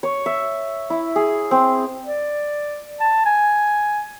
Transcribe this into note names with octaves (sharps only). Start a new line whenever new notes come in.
C#5
E5
E4
G#4
C4
D5
A5
G#5